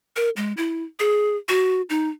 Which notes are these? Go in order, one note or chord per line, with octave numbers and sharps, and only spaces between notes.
A#4
G#3
E4
G#4
F#4
D#4